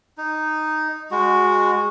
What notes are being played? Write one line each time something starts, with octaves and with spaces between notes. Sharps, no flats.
D#4
G#3 F#4